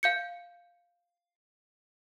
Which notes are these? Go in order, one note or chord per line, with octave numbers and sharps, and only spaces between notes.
F5 G6 C#7